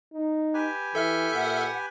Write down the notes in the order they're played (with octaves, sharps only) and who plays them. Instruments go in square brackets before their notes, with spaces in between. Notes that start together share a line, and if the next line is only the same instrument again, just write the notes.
[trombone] D#4
[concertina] G4 B4 G#5
[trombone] E3 [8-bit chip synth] A4 E5 F6
[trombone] A#2 [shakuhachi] F#5